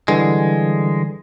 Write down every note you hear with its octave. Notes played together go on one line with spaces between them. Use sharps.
D3 E3 G3 G#3